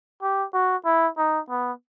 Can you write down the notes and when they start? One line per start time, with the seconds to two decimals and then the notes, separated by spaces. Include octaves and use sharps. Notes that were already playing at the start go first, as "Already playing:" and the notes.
0.22 G4
0.54 F#4
0.85 E4
1.17 D#4
1.49 B3